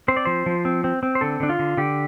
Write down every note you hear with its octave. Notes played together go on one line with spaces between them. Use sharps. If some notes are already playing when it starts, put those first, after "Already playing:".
C4 C5
D5
F3 C5
F3
C4
C4
C4
C5
D3 A4
D3 D4
F4
D3
D3 G4